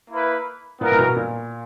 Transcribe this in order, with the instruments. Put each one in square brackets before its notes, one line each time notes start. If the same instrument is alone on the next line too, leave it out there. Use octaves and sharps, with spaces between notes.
[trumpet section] A#3 E4 B4
[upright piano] A#2 [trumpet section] B3 E4 A#4
[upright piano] A#2
B2
A#2